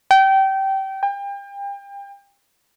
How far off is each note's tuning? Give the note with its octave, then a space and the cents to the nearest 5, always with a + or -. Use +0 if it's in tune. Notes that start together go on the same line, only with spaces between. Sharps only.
G5 -25
G5 +35